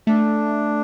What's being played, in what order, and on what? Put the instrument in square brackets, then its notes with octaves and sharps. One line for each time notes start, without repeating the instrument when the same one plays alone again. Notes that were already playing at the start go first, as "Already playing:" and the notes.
[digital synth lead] A3 [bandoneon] D4